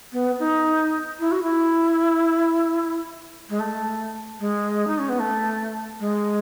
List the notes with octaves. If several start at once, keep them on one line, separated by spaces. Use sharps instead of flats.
B3
D#4
E4
F#4
E4
G#3
A3
G#3
D#4
C#4
B3
A3
G#3